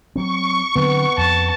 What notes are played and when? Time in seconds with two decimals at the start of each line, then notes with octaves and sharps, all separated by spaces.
0.16 F#3 C4 C#6
0.76 D3 F#3 B3 C4
1.17 F2 A5